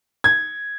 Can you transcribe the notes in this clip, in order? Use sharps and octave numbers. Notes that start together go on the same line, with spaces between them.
G#6